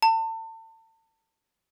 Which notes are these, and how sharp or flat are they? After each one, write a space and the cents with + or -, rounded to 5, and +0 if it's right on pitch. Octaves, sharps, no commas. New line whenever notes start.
A5 +35